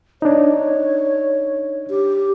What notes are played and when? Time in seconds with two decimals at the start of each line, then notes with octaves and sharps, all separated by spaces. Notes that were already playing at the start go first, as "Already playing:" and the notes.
0.22 D4 D#4 C#5
1.90 G4